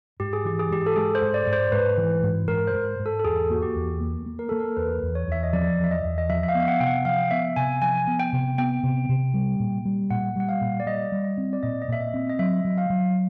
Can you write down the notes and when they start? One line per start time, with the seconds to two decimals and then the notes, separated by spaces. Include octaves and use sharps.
0.20 G#2 G4
0.33 G#4
0.45 E3 G4
0.59 G#4
0.71 G#2 G4
0.86 A4
0.96 G#3 G#4
1.15 C5
1.21 G#2
1.34 D5
1.47 G#2
1.53 C5
1.72 G#2 B4
1.97 E3
2.23 G#2
2.48 G#2 A#4
2.67 C5
2.74 G#2
2.99 G#2
3.06 A4
3.20 A4
3.24 E2 G#4
3.50 A#3 F#4
3.63 G4
3.75 E2
4.01 A#3
4.26 A#3
4.39 A#4
4.49 A#3 A4
4.60 A#4
4.77 E2 B4
5.02 E2
5.15 C#5
5.28 E2 E5
5.43 D#5
5.53 F3 D5
5.78 E2
5.84 E5
5.91 D#5
6.04 E2
6.18 D#5
6.29 F3 E5
6.43 E5
6.48 F5
6.55 B3
6.60 F5
6.68 F#5
6.80 C3 G5
6.87 F#5
7.05 F3 F5
7.31 B3 E5
7.56 C3 G#5
7.82 F3 G#5
8.07 B3
8.20 G5
8.33 C3
8.58 B3 G5
8.83 C3
9.09 C3
9.34 G3
9.60 A#2
9.85 G3
10.10 A#2 F#5
10.36 G3 F#5
10.49 F5
10.61 A#2
10.80 D5
10.86 G3 D#5
11.12 G3
11.24 D#5
11.38 C4
11.53 D5
11.63 A#2 D#5
11.82 D#5
11.88 A#2 E5
12.01 D#5
12.14 C4
12.29 D#5
12.39 F#3 E5
12.64 F#3
12.78 F5
12.90 F#3